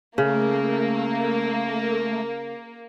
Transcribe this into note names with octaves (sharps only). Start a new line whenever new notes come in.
C#3 A3 A#3